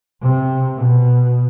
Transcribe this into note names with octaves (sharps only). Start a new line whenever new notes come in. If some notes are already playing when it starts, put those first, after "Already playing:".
C3
B2